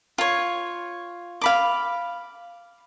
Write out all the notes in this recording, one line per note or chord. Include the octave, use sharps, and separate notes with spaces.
F4 C#5
F5 B5 D6